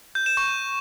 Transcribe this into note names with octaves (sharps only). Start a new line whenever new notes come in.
G6
E7
C#6